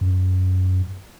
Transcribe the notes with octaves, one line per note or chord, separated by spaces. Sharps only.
F#2